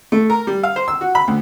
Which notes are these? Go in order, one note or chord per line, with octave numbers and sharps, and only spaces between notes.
A3
A#4
G3
F5
C5
E6
F#4
B5
D2